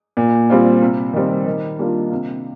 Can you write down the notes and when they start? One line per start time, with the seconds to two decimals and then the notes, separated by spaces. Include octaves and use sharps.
0.17 A#2
0.50 G3 C4 F4
0.82 C3
1.13 D#3 G3 C4
1.46 D#3
1.79 G3 A#3 D4 F4
2.11 C3